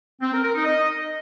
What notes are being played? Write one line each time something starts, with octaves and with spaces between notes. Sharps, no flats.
C4
A#4
A#4
D#4
D#5